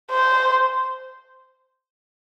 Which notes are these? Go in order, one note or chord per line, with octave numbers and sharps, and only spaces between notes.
C5